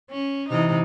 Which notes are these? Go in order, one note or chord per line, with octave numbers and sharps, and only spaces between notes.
C#4
C3 E3 D#4